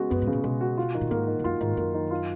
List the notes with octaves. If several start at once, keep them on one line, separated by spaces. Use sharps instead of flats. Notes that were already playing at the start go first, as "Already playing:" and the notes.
Already playing: C#3 G#3 B3 F#4
F#2 B3
G#2
C#3
A#2
B2 G#3
F#4
F4
D#3
A#2
G#2 A#3
D#3
G#2
F#2 F4
G#2 D#3
F#2 A#3
D#3
F4